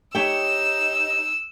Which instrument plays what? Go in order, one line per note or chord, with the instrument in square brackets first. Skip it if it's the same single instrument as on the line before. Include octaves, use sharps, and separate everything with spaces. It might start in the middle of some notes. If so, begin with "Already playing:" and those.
[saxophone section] D#4 [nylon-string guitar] G4 C#5 G5 [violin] E6